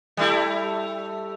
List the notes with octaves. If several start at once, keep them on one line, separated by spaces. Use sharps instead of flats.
G3 A3 E4